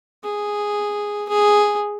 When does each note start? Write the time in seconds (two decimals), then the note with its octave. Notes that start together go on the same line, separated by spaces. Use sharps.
0.24 G#4
1.29 G#4